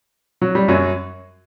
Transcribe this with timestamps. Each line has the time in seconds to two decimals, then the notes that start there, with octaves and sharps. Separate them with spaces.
0.42 F#3
0.55 G3
0.68 F#2 F#3